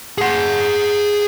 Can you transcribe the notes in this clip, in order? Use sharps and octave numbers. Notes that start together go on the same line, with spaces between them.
G#4 F#5